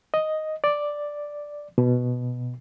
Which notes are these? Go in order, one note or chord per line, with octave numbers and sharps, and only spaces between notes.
D#5
D5
B2